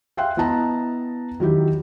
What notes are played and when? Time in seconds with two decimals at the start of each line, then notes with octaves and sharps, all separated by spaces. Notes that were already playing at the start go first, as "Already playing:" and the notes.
0.17 E5 F5 G5 C6 F#6
0.37 B3 E4 D#5 A5 A#5
1.40 D#3 F#3 E4 G4